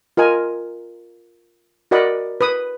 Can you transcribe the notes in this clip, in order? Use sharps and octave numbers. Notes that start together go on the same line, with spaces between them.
F4 A#4 D#5 G#5
F#4 A#4 D5 D#5 F#5 B5
B4 D#6